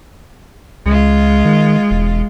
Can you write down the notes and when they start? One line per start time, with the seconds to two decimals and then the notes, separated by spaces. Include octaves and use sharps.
0.86 C#2 G#3 F4
1.45 D#3
1.91 E1